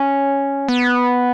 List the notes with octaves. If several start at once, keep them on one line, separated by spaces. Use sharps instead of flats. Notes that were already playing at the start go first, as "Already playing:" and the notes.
Already playing: C#4
B3